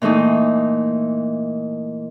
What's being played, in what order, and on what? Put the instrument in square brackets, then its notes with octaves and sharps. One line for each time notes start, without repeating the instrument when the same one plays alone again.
[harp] A#2 E3 A3 D#4